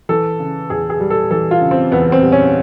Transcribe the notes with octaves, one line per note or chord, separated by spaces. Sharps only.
E3 A4
C#3
E2 G#4
G#4
G3
A4
E3 A4
F4
C#3
C4
E2 B3
C4
G3
C#4